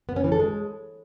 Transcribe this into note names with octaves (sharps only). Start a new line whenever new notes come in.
B3
C#4
E3
A4
G#3